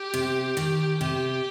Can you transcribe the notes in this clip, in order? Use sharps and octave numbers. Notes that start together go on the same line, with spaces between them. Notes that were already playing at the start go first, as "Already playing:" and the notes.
Already playing: G4
C3
D#3
C3 G4